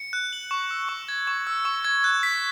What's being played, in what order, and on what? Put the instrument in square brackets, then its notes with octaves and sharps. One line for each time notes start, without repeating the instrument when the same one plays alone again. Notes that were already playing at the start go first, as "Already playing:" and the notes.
Already playing: [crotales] C#7
F#6
F#7
C#6
E6
C#6
G#6
C#6
E6
C#6
G#6
F#6
B6